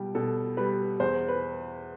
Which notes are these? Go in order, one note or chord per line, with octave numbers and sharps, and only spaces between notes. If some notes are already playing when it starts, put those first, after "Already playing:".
Already playing: B2 G3 G5
B2 A4
G3 B4
E2 C5
B4